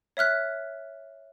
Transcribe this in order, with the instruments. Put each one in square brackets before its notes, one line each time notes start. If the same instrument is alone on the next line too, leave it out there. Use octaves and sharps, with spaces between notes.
[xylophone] C#5 E5 F6 F#6 B6